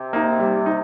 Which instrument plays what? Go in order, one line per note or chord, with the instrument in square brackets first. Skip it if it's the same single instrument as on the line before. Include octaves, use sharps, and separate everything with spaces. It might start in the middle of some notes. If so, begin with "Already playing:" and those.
Already playing: [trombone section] C3
[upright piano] A#3 D#4
G3
D#4